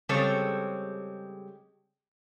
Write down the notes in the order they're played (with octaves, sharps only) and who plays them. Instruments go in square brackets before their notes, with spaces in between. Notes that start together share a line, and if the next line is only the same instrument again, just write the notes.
[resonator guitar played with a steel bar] C#3 G3 G#3 C4 A4 C#5